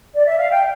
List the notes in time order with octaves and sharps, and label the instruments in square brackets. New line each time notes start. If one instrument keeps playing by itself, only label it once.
[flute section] D5
E5
F5
G5